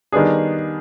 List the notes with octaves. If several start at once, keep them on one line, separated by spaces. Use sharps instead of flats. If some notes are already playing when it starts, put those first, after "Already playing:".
D#3 G3 B3 D4 G#4